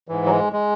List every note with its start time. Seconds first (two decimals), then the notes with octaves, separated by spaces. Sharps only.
0.08 G#2 E3
0.26 F#3
0.31 G#3
0.53 G#3